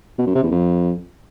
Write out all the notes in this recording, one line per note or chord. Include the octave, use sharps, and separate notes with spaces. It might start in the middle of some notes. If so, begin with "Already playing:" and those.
B2
F#2
C3
E2
F2